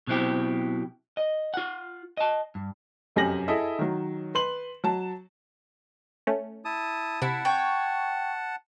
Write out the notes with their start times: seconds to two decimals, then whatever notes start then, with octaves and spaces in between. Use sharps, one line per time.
0.07 B2 F#3 C4 E4 G4
1.17 D#5
1.54 F4 F#5
2.17 D#5 A5
2.55 G2
3.16 F1 F#2 G4 G#5 A#6 F#7
3.48 E4 G#4 A4 D#5 E5
3.79 D#3 F#3
4.35 B4 C6 F#7
4.84 F#3 A5
6.27 A3 C#4
6.65 E4 A5 D#6
7.22 C3 E4 F#5 A5
7.45 C#5 G5